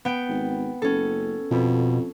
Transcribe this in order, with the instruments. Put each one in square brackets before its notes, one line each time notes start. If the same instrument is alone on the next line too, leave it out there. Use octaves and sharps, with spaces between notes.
[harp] B3 G5
[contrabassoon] G#1
[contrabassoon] F#1 [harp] C#4 A4
[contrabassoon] F2 [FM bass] B2